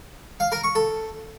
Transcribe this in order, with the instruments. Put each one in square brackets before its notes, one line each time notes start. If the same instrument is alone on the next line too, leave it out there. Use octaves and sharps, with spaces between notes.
[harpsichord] F5
A#4
C#6
A4